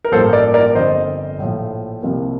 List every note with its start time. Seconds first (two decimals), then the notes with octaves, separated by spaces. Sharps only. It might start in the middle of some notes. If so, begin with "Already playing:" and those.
0.05 A#4
0.12 A1 G2 F3 A#3 A4 C5
0.33 A#4 D5
0.54 A#4 D5
0.75 G1 F2 D3 C5 D#5
1.38 A#1 A2 F3
2.02 C2 C3 F3 A#3